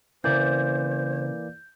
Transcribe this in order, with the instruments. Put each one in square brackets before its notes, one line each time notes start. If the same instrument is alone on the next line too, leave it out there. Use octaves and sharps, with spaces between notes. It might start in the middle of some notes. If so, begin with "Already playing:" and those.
[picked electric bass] C#3 C4 [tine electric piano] E3 A#3 D5 [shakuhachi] C5 [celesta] G6